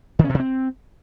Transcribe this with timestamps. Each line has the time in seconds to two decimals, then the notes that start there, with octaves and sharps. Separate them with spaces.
0.19 D#3
0.24 C#4
0.29 B2
0.34 C3
0.40 C4